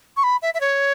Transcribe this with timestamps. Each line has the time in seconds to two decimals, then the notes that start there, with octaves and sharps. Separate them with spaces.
0.17 C#6
0.23 B5
0.42 E5
0.54 E5
0.61 C#5